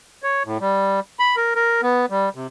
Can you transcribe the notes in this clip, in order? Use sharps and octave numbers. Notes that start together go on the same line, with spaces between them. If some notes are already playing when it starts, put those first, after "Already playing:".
C#5
A2
G3
B5
A#4
A#4
B3
G3
C3